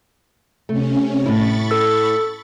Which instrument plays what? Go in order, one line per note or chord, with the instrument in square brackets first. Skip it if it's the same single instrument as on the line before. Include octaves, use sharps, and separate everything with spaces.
[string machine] C3 C#4 [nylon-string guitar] A3
[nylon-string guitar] A2 E4 [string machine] B5 C#6 A6
[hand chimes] A4 E6